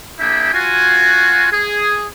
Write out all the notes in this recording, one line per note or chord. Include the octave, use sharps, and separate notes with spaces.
A#3 D4 E4 G#4 E5 G5
F4 F#4 G#5
G#4